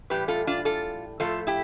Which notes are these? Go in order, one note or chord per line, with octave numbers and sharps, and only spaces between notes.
A2 E3 G3 G4 B4
F4 A4
D4 F4
F4 A4
A2 F3 A3 F4 A4
E4 G4